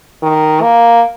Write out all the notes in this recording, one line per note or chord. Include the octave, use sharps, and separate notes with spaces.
D#3
A#3